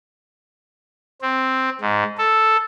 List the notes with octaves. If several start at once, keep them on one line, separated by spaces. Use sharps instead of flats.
C4
G#2
A4